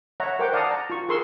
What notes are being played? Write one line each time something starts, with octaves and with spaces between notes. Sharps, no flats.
C#5 E5 F#5 A#5
A#4 C5 F#5 G5 D6
D5 F5 F#5 A5 A#5 D#6
A5 A#5
F4 C#6
G#4 A#4 C6 C#6 E6